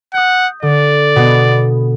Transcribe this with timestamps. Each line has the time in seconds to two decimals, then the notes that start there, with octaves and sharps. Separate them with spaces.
0.14 F#5 D#6 G6
0.63 D3 D5
1.16 B2 B3